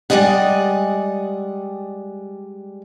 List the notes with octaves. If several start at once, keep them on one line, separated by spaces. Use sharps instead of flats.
G3 G#3 D5 D#5 F#5